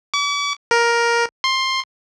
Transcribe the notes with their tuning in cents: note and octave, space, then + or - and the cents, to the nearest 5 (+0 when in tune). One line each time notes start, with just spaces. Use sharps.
D6 -45
A#4 +10
C6 +15